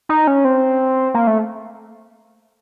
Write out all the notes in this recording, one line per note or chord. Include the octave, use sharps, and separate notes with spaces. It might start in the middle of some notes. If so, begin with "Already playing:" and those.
D#4
C#4
C4
A#3
A3